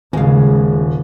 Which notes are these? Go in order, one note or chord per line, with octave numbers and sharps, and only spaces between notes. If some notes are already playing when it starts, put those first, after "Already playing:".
D#1 C#3 G#3 F5